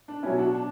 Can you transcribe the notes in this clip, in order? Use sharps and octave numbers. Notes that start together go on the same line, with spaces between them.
D4
B2 F#3 C#4 E4
D4 F#4
D4